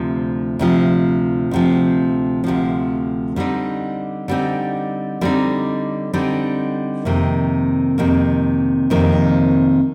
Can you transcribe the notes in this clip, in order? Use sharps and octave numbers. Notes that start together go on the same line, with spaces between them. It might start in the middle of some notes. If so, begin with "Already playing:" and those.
Already playing: D2 C3 F3
D2 C3 F3
D2 C3 F3
D2 C3 F3
D3 G3 C4 D#4
D3 G3 C4 D#4
D3 G3 C4 D#4
D3 G3 C4 D#4
F2 C3 D#3 A#3
F2 C3 D#3 A#3
F2 C3 D#3 A#3